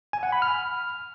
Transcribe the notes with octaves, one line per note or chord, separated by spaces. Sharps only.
G#5
F#5
B5
F6